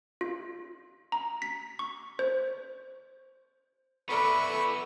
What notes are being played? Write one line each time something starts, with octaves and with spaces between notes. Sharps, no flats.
F4
A#5
B6
C#6
C5
B3 A4 B4 D5 E5 B5 C#6